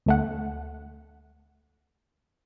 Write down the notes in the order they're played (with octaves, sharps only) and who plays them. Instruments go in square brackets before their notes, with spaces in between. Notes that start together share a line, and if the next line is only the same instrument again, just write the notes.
[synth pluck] D2 A3 F#5